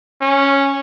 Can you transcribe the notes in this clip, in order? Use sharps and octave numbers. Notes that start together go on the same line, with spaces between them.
C#4